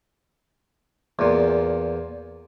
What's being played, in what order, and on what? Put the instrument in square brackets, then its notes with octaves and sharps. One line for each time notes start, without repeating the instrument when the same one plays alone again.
[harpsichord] E2 A#2